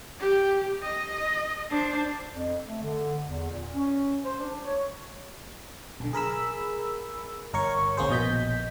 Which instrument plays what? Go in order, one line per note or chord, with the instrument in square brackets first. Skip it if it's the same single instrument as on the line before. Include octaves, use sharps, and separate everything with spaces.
[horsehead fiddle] G4
D#5
D4 C5
[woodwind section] F2
A3
D3
E2
A#2
C#4
C5
D4
C#5
[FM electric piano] B1 D3
G#4 A#4 B5 E6
G1 A#4 C#5 C#6
G1 C2 A#3 C#4 G#4 C5
A#1 B2 D#5 G6 B6